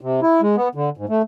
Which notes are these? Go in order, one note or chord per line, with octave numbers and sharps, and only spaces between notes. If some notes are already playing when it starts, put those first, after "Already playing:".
C3
E4
G#3
B3
D3
G#2
A3